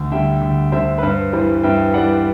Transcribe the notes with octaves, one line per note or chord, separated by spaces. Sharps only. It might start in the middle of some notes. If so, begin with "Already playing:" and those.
Already playing: D2
D3 G3 E5 G5
D2
D3 G3 C5 E5
B4
G2 C5
E3 G3 C5
G2 E5 G5
E3 G3 D5 F#5
G5